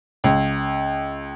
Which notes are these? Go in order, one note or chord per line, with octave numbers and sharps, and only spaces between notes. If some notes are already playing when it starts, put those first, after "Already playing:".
C#2